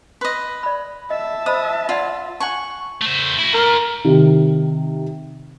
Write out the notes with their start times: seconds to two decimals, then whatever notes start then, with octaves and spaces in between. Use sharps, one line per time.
0.21 B4 D#5 C6
0.63 D5 B5
1.10 D#5 E5 A5
1.46 C5 D#5 B5 D#6
1.89 F4 D5 F#5
2.40 F#5 G#5 A5 C#6
3.02 A3 C5
3.38 E4 F#4
3.54 D#4 A#4 C6
4.05 C3 D#3